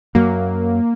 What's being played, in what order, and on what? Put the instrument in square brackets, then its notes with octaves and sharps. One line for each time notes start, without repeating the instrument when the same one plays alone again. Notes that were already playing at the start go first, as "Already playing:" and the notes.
[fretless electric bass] F#2 F#3 [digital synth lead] A#3